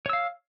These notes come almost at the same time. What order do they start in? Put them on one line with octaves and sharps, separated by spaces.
C#5 E6 F5